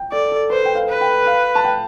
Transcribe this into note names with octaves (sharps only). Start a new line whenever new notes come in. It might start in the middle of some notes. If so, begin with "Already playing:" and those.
Already playing: G5
A4 D5
A4
B4 C5
G5
F5
B4
G5
F5
A5
G5